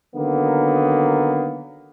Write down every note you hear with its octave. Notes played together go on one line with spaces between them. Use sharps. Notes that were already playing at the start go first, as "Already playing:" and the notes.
D3 D#3 F#3 A#3 B3